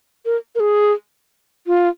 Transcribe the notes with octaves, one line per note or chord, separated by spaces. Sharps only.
A#4
A#4
G#4
F4